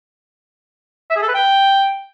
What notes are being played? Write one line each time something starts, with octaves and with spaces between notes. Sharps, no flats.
E5
G#4
A4
B4
G5